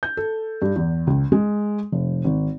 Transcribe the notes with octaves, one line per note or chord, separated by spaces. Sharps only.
G6
A4
G2
E2
C#2
G#3
F1
G#1